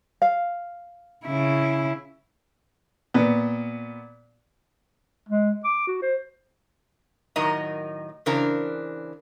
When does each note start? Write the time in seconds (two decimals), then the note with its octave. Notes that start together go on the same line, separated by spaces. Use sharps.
0.22 F5
1.25 C#3 E4
3.14 A#2 B3
5.29 G#3
5.65 D6
5.87 F#4
6.02 C5
7.36 A2 D#3 F#3 A#4 D#5 A#5
8.26 C#3 E3 D4 A#4 C5 A#5